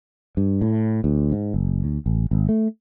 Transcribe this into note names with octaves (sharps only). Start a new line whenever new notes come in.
G2
A2
D2
G#2
F#1
D2
A1
G#1
A3